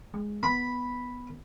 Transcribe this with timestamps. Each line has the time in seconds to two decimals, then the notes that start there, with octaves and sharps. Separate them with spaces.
0.14 G#3
0.43 B3 B5